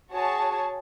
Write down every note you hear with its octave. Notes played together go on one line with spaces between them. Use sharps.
F#4 G#4 C#5 A5